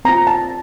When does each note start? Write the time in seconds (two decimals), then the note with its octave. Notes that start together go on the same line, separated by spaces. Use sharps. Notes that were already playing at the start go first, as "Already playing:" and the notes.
0.05 C4 F4 A#5
0.27 A5